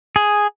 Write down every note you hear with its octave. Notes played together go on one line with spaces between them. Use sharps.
G#4